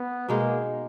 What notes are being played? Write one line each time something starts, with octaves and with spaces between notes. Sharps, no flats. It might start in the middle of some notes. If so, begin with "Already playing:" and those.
Already playing: B3
B2 G#3 A#3 D#4 G#4